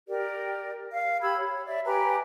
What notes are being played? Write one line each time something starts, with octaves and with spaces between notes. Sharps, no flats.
G4 A#4 D5
F5
G4 B5 E6 G#6
C#5
D5 E5
G4 B4 G#5 A#5